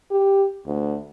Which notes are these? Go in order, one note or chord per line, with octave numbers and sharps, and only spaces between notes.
G4
D2